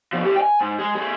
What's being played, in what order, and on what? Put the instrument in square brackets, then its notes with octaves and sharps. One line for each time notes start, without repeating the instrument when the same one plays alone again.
[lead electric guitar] B2 F3
A2 G4
G5 G#5
G#2
G#3 G#4
A3 G#4